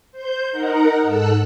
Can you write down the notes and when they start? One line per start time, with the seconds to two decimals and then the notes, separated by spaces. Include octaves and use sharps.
0.12 C5 G6
0.51 D#4 A#4 F#5 A#5
1.03 G#2 A4 E6 F#6